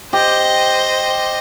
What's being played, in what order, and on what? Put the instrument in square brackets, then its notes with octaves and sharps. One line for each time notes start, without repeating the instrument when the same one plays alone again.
[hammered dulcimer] G4 [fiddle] C5 D#5